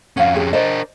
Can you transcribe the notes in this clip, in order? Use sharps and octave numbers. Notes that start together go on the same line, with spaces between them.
F2 C#4 F5 F#5
G4 G#4
D4 A#4 C5 D5 D#5